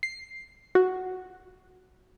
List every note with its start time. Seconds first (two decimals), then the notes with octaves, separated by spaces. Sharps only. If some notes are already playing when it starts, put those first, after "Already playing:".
0.03 C7
0.75 F#4